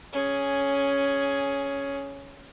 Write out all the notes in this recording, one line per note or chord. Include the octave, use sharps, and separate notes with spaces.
C#4 G#4